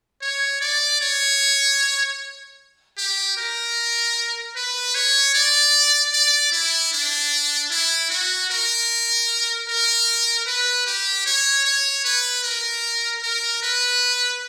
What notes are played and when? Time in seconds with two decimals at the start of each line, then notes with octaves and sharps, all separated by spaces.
0.22 C#5
0.61 D5
1.01 C#5
2.98 G4
3.37 A#4
4.56 B4
4.95 C#5
5.34 D5
6.13 D5
6.52 E4
6.93 D4
7.71 E4
8.10 F#4
8.50 A#4
9.68 A#4
10.47 B4
10.86 G4
11.26 C#5
11.65 C#5
12.05 B4
12.44 A#4
13.23 A#4
13.63 B4